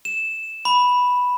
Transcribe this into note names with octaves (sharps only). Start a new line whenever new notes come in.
E7
B5